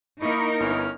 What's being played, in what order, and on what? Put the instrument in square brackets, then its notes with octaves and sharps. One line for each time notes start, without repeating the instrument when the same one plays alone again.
[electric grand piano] A#3 E4 [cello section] D#4 A#4 [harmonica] B5 C#6
[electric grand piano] G1 B3 E4 [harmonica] C#4 F6